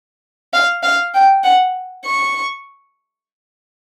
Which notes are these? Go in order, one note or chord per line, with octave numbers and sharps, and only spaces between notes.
F5
F5
G5
F#5
C#6